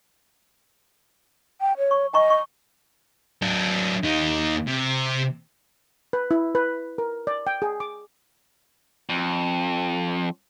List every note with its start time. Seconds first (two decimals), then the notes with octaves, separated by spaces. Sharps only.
1.61 G5
1.78 C#5
1.91 C#6
2.14 D#5 G#5 A#5 C#6
2.30 C#6
3.42 F#3 D4
4.03 D#2 D#4
4.67 C3
6.13 B4
6.31 E4
6.55 B4
6.98 A#4
7.27 D5
7.47 G5
7.62 G#4
7.80 D6
9.09 F2